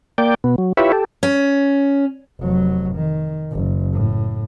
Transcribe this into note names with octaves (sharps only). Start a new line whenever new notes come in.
A#3 D5 G5
B2 B3
F#3
E4 F4 G4 B4 C#5 E5
G4 A4
C#4
F1 F#3
D#3
F#1
A2